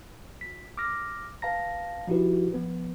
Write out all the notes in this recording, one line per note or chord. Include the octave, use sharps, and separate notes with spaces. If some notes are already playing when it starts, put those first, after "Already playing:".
G1 B6
D6 E6 F6 A#6
B4 F5 A5 A#5 A#6
F3 D#4 E4 F#4 G4 B4
F3 B3 B4